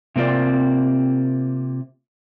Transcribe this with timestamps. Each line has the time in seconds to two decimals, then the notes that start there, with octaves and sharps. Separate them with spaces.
0.16 C3 A#3 C4 F4 D5